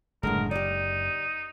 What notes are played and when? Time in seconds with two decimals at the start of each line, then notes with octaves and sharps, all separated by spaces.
0.23 F#1 A2 D3 G#3 A#4
0.51 D#4 G4 D5